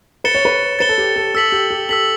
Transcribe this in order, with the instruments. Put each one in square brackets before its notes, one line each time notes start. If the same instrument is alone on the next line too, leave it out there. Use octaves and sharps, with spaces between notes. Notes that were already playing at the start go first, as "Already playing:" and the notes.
[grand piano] B4 [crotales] A6 C#7 E7 G7
[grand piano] C#5
B4
[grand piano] B4 [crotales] A6 C#7 E7 G7
[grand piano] A4
G4
A4
[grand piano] A4 [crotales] E6 B6 F#7
[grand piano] G4
G4
[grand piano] A4 [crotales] E6 B6 F#7